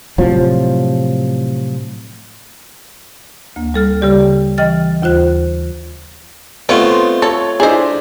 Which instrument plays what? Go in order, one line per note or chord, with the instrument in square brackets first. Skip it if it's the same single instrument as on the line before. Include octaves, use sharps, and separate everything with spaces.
[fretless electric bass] A2 C3 F3 F#3
[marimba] D2 A#3
G3 A4 F6 A6
C#3 G3 G4 D5
E3 D#5 G5 F6 A6
D#2 F4 C5 F#6
[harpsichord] A3 F4 [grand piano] B3 C4 D#5 [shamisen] C#5
[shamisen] A4 [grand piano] C#5
[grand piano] D4 E4 D#5 [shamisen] G#4 C5